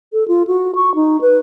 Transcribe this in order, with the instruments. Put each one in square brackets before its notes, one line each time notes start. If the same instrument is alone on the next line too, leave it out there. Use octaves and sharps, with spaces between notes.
[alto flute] A4
F4
F#4
C#6
D#4
B4